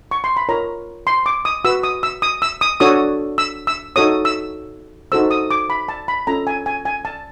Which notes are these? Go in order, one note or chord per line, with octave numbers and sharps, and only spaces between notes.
C#6
C6
B5
F4 A#4 C#5 A#5
C6
D6
D#6
F#4 B4 E6
D#6
E6
D#6
E6
D#6
D4 F#4 A4 C#5 D#6
E6
E6
D#4 F#4 A4 C#5 D#6
E6
D#4 F#4 A4 C5 E6
D#6
D6
B5
A5
B5
C#4 F4 A4 A#5
G#5
G#5
G#5
A5